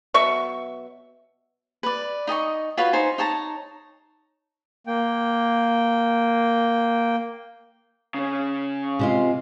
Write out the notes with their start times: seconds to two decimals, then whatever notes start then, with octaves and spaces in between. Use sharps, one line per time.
0.14 B2 F#3 E5 C#6
1.83 B4 D5
2.27 D#4 D#5 G5 C#6
2.77 F4 F#4 B4 C#5
2.93 D#4 C5 G#5
3.18 D#4 C#5 A5 A#5
4.87 A#3 G5
8.14 C#3 C#4
8.99 C3 G#3 F4